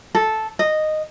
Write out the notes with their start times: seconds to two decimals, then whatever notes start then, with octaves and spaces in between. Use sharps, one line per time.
0.15 A4
0.59 D#5